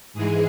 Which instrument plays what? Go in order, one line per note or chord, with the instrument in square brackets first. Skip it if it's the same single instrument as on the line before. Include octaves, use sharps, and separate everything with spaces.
[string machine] G#2 E3 G#3 G#4